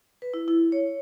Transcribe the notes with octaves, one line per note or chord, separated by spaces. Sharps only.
B4
E4
E4
C#5